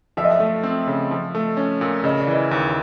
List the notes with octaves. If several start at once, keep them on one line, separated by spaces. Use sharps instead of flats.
F3 E5
D#5
E5
A3
C4
C#3
F3
A3
C#4
A#2
C#3 D#5
D5
E3
D#5
D#2